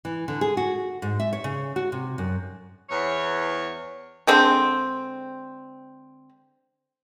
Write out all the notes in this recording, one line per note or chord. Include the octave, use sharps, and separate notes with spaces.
E3
D3
G#4
F#4
G#2
E5
C#5
C#3
F#4
C3
F#2
E2 C#5
D3 G#3 C4